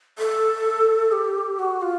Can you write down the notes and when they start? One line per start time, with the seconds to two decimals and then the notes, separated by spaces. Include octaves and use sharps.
0.19 A4
1.12 G4
1.59 F#4
1.82 F4